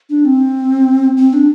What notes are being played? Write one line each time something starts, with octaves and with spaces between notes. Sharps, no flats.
D4
C4
C4
D4